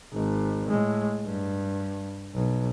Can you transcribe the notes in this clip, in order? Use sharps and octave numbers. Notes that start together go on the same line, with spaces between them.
G#1
A2 G#3
G2
B1